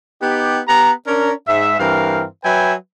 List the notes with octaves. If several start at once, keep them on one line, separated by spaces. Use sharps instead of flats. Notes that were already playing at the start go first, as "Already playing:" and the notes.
B3 D#4 G4
B3 G4 A#5
C#4 D4 A#4
G#2 E5
G2 E3 C4 A#4 F5
F#3 B4 E5 G5 G#5